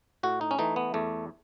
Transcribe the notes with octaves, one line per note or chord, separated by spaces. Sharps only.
A2 F#4
D#4
C#4
E3 A3 D#4
B3
E2 A3